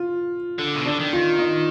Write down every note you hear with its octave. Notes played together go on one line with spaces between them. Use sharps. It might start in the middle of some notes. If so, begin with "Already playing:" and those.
Already playing: F4
D3
B2
D3 D4
D#3
F4
D#4